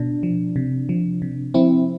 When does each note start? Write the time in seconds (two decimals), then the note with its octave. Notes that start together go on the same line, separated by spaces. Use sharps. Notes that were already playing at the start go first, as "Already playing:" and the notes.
Already playing: B2 D4
0.23 F3
0.56 C3
0.89 F3
1.22 C3
1.54 F3 C4 E4